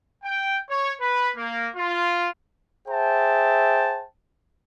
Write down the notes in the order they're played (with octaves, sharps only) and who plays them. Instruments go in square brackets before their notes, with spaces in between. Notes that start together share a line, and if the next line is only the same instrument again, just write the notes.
[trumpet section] G5
C#5
B4
A#3
F4
[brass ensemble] G#4 C5 E5 G5 A5